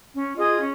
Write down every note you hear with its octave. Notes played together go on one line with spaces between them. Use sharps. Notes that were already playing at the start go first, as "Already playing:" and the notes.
C#4
F4 G#4 D#5
C#4